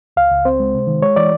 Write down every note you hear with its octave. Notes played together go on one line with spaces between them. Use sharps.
C#2 F5
C#2
C4 C5
G#3
C3
D#3
G#3 C#5
E3 D5